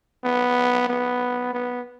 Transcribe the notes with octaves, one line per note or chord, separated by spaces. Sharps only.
B3
B3
B3